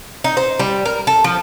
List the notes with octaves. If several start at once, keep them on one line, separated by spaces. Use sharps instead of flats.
D#4
C5
G3
A#4
A4
F3